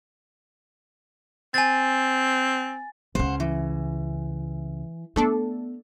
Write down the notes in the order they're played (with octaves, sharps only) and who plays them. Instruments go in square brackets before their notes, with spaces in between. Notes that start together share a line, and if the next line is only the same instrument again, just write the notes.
[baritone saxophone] C4 [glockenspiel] G#5 A6
[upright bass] C#2 C#3 [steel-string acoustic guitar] C5 F#5
[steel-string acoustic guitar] E3
[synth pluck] A3 D4 A4 [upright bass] B3